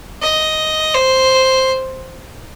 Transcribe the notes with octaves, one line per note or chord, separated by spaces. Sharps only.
D#5
C5